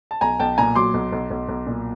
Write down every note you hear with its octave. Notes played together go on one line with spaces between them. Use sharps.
A5
B1 G#5 A#5
B1 G5 A5
A#2 G#5 A#5
F#3 C6 D6
B1
B1
B1
B1
A#2